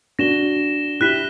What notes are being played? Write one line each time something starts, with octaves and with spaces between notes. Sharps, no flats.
D4 F#4 A#6 E7 G7
E4 G4 F#6 B6 E7 G7